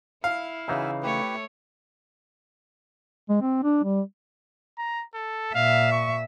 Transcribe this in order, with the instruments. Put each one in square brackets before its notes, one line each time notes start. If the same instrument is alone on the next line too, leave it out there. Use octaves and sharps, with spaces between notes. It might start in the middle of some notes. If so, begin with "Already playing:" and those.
[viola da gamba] E4 [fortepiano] F5
[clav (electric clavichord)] C#3 E3 D#4 [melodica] F#4 E5 G#5
[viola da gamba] A3 C#5 [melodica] E4 G4 B4
[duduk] G#3
C4
D4
G3
[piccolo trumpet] A#5
A4
[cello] A#2 E5 [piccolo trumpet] F5
[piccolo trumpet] C#6